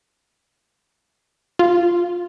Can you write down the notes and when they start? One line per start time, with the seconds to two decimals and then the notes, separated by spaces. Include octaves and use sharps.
1.59 F4